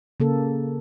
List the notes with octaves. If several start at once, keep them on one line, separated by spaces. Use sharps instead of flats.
C#3 A#3 A4